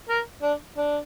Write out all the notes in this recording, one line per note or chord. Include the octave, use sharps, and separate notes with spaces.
A#4
D4
D4